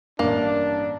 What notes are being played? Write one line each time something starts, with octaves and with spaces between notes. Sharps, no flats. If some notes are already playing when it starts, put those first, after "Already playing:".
A1 G2 A#3 D4